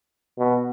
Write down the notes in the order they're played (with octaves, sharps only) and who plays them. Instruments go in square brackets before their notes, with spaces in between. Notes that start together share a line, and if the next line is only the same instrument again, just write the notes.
[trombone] B2